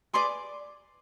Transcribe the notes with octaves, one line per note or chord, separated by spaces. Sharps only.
G#4 B4 D5 C6 D6